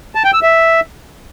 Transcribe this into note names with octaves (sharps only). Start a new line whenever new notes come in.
A5
G5
E6
E5